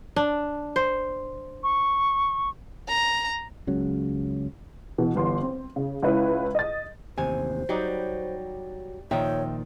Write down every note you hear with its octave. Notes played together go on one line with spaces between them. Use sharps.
D4
C5
C#6
A#5
C#2 C#3 F#3
B2 E3
G1 E3 B3 C6
C4
C#3
C#2 C#4 E4 B4
D#5 A6
A1 D#2 C3 C5 G#5
F#3 G3 D#4 G4
A#2 D#3 F3 D#4 C#5 E5 G5